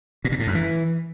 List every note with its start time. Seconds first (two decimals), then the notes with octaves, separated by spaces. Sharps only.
0.25 A#2
0.32 C3
0.40 A2
0.47 F#2
0.55 E3